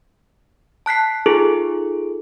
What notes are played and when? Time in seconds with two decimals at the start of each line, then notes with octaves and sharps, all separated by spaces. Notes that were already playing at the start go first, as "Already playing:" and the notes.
0.86 A5 F#6 B6 C7
1.26 D#4 F4 G#4 A4